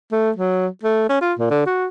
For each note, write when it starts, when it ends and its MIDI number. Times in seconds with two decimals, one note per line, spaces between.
0.12 0.31 57
0.36 0.67 54
0.83 1.07 57
1.09 1.20 61
1.21 1.33 65
1.39 1.50 46
1.50 1.62 50
1.66 1.87 66